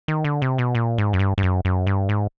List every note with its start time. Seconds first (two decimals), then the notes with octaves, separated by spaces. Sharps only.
0.08 D#3
0.24 D3
0.42 C3
0.58 B2
0.75 A#2
0.98 G#2
1.13 F#2
1.19 G2
1.38 G2
1.43 F#2
1.65 F#2
1.87 G2
2.09 G#2